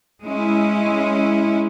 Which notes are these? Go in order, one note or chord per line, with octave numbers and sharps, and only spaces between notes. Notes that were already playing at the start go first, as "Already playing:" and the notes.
G#3 C#4 E4